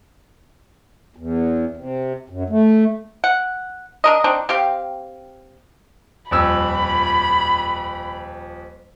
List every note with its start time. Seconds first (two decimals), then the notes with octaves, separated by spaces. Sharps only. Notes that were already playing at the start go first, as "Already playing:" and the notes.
1.16 E2
1.76 C3
2.29 F#2
2.50 A3
3.24 F#5
4.04 D4 A#4 D#5
4.24 C4 D4 D#4
4.49 C4 G4 F5
6.31 D#1 F2 B5 E6